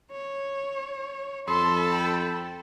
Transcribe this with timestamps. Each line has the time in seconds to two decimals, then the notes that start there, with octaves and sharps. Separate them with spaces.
0.11 C#5
1.48 F2 A4 A5 B5 C6
1.92 G5